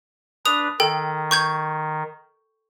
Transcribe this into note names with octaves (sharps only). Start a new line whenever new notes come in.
D4 B4 D#6 F7
D#3 A4 G5
C#6 G6 G#6